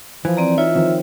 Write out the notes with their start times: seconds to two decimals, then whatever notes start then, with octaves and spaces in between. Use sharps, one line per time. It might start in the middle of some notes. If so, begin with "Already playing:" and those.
0.25 E3 F3
0.37 C4 D5 A#5
0.58 D#4 F4 C#5 E5
0.75 D#3 F3 C4